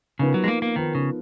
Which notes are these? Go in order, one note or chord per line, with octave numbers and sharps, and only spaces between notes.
C#3 F3 B3 D#4 A#4
F#3
G#3
A#3
A#3
D#3 F3 B3 D#4 A#4
C#3